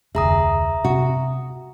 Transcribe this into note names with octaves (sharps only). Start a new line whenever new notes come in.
F1 D2 G#4 E5 A#5 D#6
C3 F#4